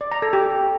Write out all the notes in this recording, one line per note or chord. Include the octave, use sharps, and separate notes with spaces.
D5
A#5
A4
G4